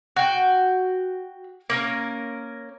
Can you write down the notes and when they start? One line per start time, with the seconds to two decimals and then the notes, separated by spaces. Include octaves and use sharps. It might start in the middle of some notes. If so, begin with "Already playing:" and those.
0.16 F#4 G5
1.70 A#3 C#4 A#4